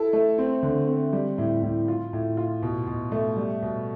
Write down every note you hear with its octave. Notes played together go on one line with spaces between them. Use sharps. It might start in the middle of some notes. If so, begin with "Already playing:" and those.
Already playing: E4 A4
A3
C4
D3
C4
G3
A2
A2
F4
A2
F4
B2
B2
A3
G3
B2